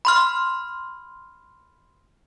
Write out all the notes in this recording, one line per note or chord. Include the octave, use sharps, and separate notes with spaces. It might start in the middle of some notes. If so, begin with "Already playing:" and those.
B5 C6 F6